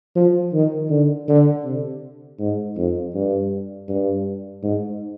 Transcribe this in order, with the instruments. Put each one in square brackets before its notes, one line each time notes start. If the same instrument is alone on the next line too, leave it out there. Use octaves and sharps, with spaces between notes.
[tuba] F3
D#3
D3
D3
C3
G#2
F2
G2
G2
G#2